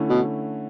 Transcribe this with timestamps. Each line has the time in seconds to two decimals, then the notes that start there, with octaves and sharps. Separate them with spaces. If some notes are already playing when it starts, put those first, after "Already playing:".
Already playing: D3 A3 C#4 E4
0.09 B2